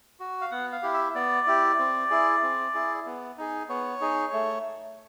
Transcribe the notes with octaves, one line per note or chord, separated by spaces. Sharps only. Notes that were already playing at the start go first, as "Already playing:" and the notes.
F#4
F5
B3 F#5
F5
E4 G4
E5
B3 D5
E4 G4
C4
E4 G#4
C4
E4 G#4
B3
D#4 G#4
B3 C#5
D#4 G#4
A3